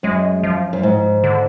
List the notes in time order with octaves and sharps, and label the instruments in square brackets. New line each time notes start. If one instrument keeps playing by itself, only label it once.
[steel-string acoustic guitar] F#2 [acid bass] G#3
[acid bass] F3
[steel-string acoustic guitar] F#2
G#2
[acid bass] D3